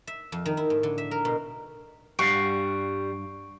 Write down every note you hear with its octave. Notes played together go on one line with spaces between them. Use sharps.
E5
F2
D#3
E4
A2
D3
E5
A#4
B2
G2 G3 F5 F#5 C#6 D7